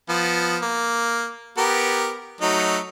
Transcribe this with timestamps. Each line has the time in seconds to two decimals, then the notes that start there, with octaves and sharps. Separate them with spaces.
0.09 F3 B3
0.62 A#3
1.58 B3 G4 A#4
2.41 F#3 A3 D#4